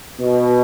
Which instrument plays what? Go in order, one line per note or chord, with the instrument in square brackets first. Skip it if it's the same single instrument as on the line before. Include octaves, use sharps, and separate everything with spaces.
[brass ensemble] B2